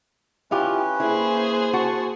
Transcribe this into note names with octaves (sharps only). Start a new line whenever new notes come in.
C#4 E4 F4 G4 B4
A#3 E4 G#4 C5
F#4 A5 C#6